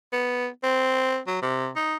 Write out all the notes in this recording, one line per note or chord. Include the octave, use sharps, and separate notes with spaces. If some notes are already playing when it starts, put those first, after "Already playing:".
B3
C4
F#3
C3
D#4